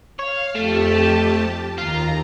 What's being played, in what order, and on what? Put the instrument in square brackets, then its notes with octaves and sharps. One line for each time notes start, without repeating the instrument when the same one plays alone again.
[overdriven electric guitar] C#5 [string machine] F5
[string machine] F2 G4 A5 [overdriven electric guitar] A3
[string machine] D#2 A#5 [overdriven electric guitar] F4